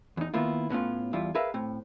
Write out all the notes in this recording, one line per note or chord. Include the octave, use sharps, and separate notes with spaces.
E2 D#4
D#3 A#3 B3 E4 F4
A2 B3 C#4 F4
E2 G3 E4 F4
G#4 A#4 B4 E5 F5
A2 C4